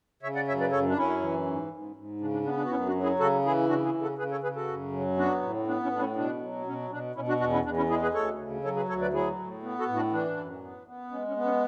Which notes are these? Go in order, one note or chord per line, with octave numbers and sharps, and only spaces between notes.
C#3 C#5 E5
D5 F#5
F#2 C#5 E5
B4 D5
F#2 A4 C#5
D4
F#2 C#4 E4
E3
G#2
G#2
G#2
C#3 D4
D4
B3 D4
D4
F#4
F#2 C#4 E4
D4 F#4
F#3
E4 G#4
C#3 F#4 A4
E3 E4 G#4
C#3 D4 F#4
E4 G#4
C#3
F#4 A4
C#3 G#4 B4
A4 C#5
C#3 G#4 B4
F#4 A4
F#2
F#3
B3 D4 F#4
A2
B3 D4
C#4 E4
A2 D4
C#4 E4
B2 D4
F#3
B2 C#4
B2 D4
B2 C#4 E4
D4 F#4
E2 D4 F#4
C#4 E4
E2 D4
C#4 E4
G#3 E4 G#4
G#4 B4
D2 A4 C#5
C#3
F#3 A4 C#5
G#4 B4
D2 A4 C#5
B4 D5
F#3 E4 G#4
A2
B3
F#4 A4
A2
D4 F#4
E3 D4
F#2
B3
B3
G#3 C#4
C#4
B3
C#4